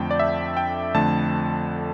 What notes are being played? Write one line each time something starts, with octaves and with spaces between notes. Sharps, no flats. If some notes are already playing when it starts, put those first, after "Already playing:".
Already playing: F2 D3 A3 G5 A5
D5
E5
G5
F2 D3 A3 A5